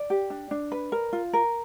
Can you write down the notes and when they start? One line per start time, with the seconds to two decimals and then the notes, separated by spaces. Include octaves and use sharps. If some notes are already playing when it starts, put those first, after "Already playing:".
Already playing: D5
0.10 G4
0.30 D4
0.51 D4
0.72 B4
0.92 A#4
1.13 F4
1.33 A#4